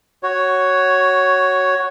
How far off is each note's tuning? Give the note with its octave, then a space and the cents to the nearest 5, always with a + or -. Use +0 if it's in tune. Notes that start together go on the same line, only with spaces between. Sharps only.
F#4 +10 C#5 +0